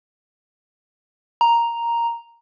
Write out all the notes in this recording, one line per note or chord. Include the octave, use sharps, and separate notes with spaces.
A#5